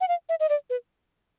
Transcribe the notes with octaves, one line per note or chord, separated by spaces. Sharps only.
F#5
F5
E5
D#5
D5
B4